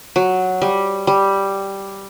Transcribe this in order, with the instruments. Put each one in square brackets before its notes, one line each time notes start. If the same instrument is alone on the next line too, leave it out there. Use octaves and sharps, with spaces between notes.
[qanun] F#3
G3
G3